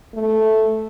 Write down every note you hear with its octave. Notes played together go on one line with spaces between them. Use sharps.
A3